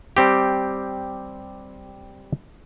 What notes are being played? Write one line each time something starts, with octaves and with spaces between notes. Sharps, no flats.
G3 C4 G4